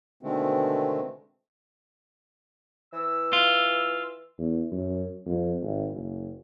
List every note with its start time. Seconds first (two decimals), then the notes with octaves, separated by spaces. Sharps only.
0.23 B2 D3 D#3 G#3 A3 C4
2.93 E3 E6
3.33 F4
4.39 E2
4.72 F#2
5.26 F2
5.62 G#1
5.92 F#1